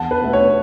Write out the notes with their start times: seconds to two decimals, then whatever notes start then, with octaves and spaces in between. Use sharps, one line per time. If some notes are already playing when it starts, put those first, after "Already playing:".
Already playing: E2 F#5 A5
0.11 B4
0.21 B2 A3
0.33 C#5